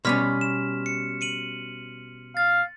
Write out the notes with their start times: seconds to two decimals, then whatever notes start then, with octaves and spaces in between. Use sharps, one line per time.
0.05 B2 G3 C#4 C6 F6 B6
0.41 E7
0.86 C#7
1.21 C#7 D#7 F#7
2.37 F5 A6